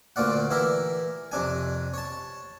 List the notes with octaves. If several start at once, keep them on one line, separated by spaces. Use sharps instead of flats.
D2 A#2 F4 D5 F#5
E3 E4 G4 A#4 E5
F2 C3 D4 G#5
C#5 A5